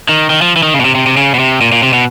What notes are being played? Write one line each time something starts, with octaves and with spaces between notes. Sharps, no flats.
D#3
D#3
F3
E3
D#3
C#3
B2
C3
C3
C3
C#3
B2
C3
A#2
A#2
C3
B2